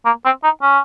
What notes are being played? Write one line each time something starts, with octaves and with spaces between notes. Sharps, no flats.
A#3
C4
D#4
C#4